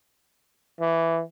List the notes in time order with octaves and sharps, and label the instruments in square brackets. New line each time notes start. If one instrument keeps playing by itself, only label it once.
[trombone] E3